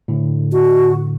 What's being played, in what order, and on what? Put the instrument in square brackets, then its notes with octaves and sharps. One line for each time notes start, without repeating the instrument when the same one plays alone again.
[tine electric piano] A2 D3
[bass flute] F#4